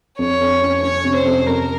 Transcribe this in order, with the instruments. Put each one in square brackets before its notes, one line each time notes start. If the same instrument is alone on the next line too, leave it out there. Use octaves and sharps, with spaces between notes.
[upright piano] F2 [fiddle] C#5
[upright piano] F2
C#4
[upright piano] C#4 [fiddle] C#5
[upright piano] C3
[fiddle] C5
[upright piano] F2
[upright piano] F2 [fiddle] A#4